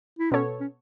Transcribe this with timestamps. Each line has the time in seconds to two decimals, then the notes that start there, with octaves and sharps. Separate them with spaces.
0.19 E4
0.31 B2 B3 C#4 A4 C#5
0.60 C#4